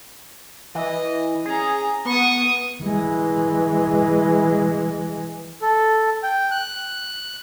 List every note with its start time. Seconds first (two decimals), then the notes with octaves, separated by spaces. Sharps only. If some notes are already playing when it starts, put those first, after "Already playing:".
0.75 E3 D#5
1.45 C#4 G#4 A#5
2.05 B3 C#6 D#6
2.83 E3 G#3
5.62 A4
6.23 G5
6.51 F#6